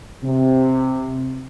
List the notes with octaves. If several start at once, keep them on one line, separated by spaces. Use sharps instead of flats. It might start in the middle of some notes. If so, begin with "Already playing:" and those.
C3